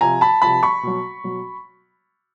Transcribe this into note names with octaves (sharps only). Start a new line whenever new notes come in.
C3 F3 G#5 A#5
A5 B5
C3 F3 A5 B5
B5 C#6
B2 F#3
B2 F#3